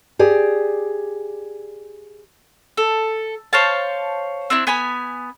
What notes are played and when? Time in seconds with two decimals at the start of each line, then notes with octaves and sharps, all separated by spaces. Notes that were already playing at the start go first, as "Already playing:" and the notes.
0.19 G4 G#4 D5
2.77 A4
3.53 C5 C#5 F5 A5
4.50 C4 D4 E4
4.67 B3 G#5 B5